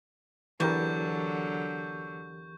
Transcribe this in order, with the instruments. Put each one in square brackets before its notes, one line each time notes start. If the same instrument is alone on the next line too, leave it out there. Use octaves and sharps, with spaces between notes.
[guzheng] E2 [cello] D3 F#3 [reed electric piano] E3 G4 A#4 [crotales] C#6 G6